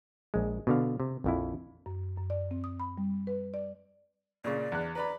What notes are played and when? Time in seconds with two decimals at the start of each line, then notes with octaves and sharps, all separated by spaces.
0.34 A#1 G#3
0.67 B2 D3 F5
1.00 C3
1.24 A#1 F2 E4
1.86 F#2
2.17 F#2
2.30 D5
2.51 C4
2.64 D#6
2.80 B5
2.97 G3
3.27 B4
3.54 D5
4.44 A#2 C#3 D5
4.72 E2 F#6
4.95 B4 D5 A#5 B5